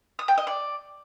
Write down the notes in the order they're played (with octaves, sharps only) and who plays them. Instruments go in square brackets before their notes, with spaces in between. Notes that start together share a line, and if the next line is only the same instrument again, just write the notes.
[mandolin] D#6
G5
D#5
D5